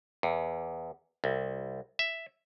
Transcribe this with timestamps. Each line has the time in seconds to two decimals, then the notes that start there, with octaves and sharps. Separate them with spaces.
0.23 E2
1.24 C2
1.99 E5